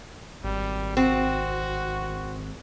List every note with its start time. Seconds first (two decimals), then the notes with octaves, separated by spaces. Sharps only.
0.44 G#1 G3
0.97 C4 F#4